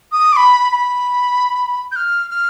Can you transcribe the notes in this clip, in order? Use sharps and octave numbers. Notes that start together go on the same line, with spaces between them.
D#6
D6
B5
B5
G6
F6
F6